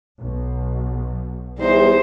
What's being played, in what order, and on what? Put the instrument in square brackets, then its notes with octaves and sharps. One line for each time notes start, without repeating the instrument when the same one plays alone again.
[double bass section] B1 B2
[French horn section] E2 G3 [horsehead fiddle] D#4 C5